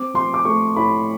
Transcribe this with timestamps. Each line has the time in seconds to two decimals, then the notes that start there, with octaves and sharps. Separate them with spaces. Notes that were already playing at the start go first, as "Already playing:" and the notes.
Already playing: C4 D6
0.14 F3 C6
0.34 D6
0.45 A3 C#6
0.76 A2 B5